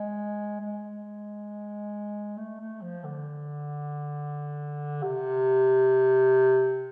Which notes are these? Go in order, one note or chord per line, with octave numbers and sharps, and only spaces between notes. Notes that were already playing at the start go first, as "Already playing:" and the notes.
Already playing: G#3
G#3
A3
A3
F3
D3
C3